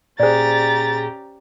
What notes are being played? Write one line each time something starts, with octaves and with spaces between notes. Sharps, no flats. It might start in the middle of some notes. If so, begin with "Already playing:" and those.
A#2 C#4 G4 G#4 C5 D5 A#5 A6